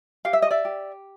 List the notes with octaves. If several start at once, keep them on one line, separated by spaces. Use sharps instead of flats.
G4 F5
E5
D#5
D5 E5
G4